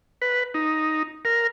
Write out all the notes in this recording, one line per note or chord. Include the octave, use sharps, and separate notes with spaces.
B4
D#4
A#4